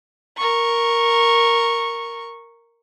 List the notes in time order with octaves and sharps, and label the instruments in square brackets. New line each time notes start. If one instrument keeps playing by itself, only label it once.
[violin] A#4 C#6